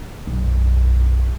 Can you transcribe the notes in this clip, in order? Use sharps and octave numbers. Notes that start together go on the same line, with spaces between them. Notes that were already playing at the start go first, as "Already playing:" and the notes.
B1 F#2